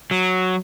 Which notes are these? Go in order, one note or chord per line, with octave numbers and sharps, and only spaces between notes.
F#3